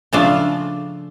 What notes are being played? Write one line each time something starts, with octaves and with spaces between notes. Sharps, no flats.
C#3 F3 A3 D4 F4